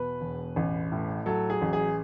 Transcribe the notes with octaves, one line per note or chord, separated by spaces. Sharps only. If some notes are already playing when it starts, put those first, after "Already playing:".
Already playing: E2 B2 B4
E1
A1
A2
F#3 A4
G#4
A1
G#4